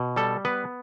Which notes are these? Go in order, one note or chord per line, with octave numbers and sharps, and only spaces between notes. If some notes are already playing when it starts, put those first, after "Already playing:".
Already playing: B2
G3 A4
B3 B4